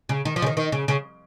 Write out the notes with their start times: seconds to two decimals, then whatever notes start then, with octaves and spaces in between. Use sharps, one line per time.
0.09 C#3
0.25 D#3
0.36 F3
0.42 C#3
0.46 D#3
0.57 D#3
0.72 C#3
0.88 C#3